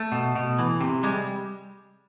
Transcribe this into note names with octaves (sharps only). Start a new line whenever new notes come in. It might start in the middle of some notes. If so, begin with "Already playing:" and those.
Already playing: A3
B2
B2
E3
C3
G3 G#3